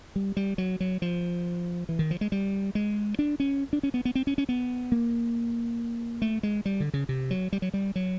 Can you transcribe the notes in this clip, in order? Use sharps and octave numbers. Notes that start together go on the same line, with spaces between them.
G3
G3
F#3
F#3
F3
E3
D#3
F3
G#3
G3
G#3
D4
C#4
D4
C#4
B3
B3
C4
C#4
C#4
B3
A#3
A3
G#3
G3
D3
C#3
C3
F#3
G3
F#3
G3
F#3